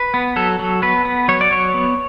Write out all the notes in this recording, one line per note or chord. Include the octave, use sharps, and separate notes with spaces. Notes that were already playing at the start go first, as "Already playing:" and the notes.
Already playing: B4
B3
F#3 A4
F#3
B3 B4
B3
F#3 C#5
D5
F#3 C#5
B3